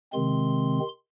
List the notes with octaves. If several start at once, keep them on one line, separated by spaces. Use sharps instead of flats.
C3 D#3 G#3 C4 C6